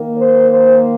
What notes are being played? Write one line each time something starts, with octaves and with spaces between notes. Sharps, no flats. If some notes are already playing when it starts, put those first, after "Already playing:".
Already playing: D#3 A#3
C5
C5